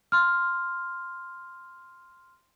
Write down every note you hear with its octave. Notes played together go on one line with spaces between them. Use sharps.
C6 F6